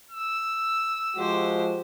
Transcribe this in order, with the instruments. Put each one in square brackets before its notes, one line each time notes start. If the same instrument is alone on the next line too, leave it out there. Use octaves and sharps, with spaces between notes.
[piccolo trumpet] E6
[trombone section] F3 G#3 F#4 [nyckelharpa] G4 C5